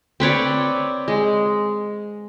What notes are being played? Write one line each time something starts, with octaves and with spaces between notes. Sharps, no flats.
C4 B4 C#5 D5
G#3